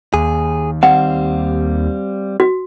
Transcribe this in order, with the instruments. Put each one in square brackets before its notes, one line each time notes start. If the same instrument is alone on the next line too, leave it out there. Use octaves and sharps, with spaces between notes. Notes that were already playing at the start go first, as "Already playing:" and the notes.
[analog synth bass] D#2 [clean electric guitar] G#4
[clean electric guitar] G3 C4 F5 [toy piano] F#5
[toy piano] F#4